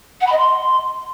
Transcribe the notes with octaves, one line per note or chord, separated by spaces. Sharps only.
F#5
B5
D#5
C6